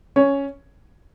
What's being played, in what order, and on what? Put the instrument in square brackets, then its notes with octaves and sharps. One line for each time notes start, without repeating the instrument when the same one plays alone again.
[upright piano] C#4 C#5